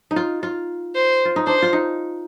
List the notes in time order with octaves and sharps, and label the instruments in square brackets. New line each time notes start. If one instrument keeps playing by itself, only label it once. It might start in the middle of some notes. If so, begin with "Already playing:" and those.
[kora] D#4
F4
F4
[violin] C5
[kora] F4
D#4
[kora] D4 [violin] C5
[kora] F4
D#4